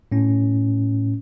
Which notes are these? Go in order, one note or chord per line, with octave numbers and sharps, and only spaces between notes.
A2 C#4